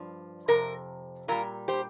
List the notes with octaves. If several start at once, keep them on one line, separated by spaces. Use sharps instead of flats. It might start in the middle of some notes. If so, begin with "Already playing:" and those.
Already playing: G2 F3
F2 C3 A#4
A#2 G3 F4 A#4
G4 C5